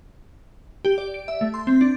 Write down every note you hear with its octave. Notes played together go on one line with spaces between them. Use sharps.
G4
D5
D7
E5
A3
C6
C4
D4